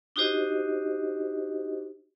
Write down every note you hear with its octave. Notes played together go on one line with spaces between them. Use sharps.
D4 D#4 F#4 G4 C5 D#5